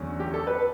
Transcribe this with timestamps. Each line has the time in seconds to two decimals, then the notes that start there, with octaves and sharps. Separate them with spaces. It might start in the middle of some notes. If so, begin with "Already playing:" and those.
Already playing: E2 D3 F#3 A3 C#4
0.20 G4
0.34 A4
0.47 B4